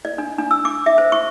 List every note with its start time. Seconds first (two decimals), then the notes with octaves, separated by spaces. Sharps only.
0.05 D5
0.18 D4
0.39 D4
0.51 E6
0.65 D6
0.86 E5
0.98 C5
1.12 C#6